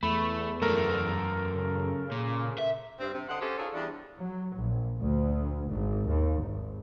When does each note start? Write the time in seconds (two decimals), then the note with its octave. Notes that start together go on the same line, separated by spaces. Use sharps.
0.03 E2 A3 B5
0.62 F#2 A3 A4 A#4
1.56 C#3
2.12 A#2
2.58 E5
3.00 G2 C4
3.14 C3
3.28 D3 C5 D#5 F#5
3.40 C#4 G4 A4 C5 C#5
3.58 D4 D#4 F4 G#4 A4 C#5
3.73 E2 G3 D4
4.18 F#3
4.55 A#1
4.98 D2
5.68 G#1
6.08 D#2
6.40 G#1